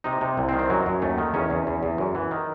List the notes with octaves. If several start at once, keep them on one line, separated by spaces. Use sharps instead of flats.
C3 D#4
C3
C2
C4
D#3
C4
F#2 F#3
F#2
D#2 A3
D#3
E2 C#4
E2
E2
E2
F#2
E3
D#3